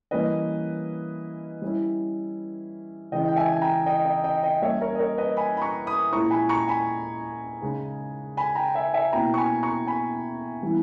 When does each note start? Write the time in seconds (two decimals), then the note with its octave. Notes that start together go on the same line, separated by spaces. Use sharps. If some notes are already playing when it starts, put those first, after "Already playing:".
0.11 E3 G3 A#3 C#4 E4 B4 D#5
1.62 G3 C#4 E4
3.12 C#3 E3 G#3 C#4 E4 D#5 G5
3.28 G5
3.36 E5 G#5
3.52 G#5
3.61 G5 A#5
3.86 D#5 G5
4.05 D#5 G5
4.24 D#5 G5
4.43 D#5 G5
4.62 G3 A#3 C#4 C#5 E5
4.81 A#4 C#5
4.95 D#5
4.99 A#4 C#5
5.18 B4 D#5
5.37 G#5 B5
5.57 B5
5.62 A#5 C#6
5.86 B5 D#6
6.12 A#2 G#3 C#4 E4 A#5 C#6
6.30 G#5 B5
6.49 A#5 C#6
6.68 G#5 B5
7.62 C#3 G#3 D#4
8.37 G#5 B5
8.55 G5 A#5
8.74 E5 G#5
8.93 E5 G#5
9.12 B2 A#3 C#4 E4 G5 A#5
9.34 C#6
9.37 G#5 B5
9.63 A#5 C#6
9.87 G#5 B5
10.62 E3 G3 B3 E4